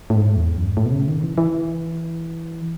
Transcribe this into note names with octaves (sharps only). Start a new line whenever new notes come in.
A2
G#2
E2
F#2
G#2
A2
B2
C#3
D#3
E3
E3